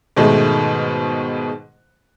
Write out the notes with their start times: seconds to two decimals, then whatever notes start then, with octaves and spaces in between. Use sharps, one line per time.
0.17 G#2 B2 D#3 G#3 A3